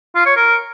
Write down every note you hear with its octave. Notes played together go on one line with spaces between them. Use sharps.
F4
C#5
A#4